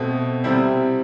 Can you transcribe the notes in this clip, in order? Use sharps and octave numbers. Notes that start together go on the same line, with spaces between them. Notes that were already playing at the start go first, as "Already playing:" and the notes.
Already playing: B2 A3 C4
C3 G3 C4 E4